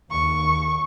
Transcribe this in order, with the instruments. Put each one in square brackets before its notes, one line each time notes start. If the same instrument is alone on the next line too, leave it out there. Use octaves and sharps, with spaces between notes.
[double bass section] D#2 [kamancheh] C#6